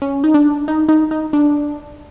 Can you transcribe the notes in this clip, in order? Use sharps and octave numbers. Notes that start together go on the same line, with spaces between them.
C#4
D#4
D4
D#4
D#4
D#4
D4